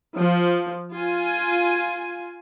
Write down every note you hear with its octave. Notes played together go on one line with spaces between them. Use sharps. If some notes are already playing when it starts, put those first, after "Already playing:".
F3
F4 G#5